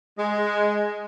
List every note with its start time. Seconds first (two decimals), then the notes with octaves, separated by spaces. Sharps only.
0.17 G#3